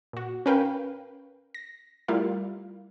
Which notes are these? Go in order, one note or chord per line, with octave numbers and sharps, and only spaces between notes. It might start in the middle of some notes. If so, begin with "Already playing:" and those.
A#2 F#4
C#4 A#4 B4 F5 G5
A#6
G3 A3 E4 F4 A#4 F5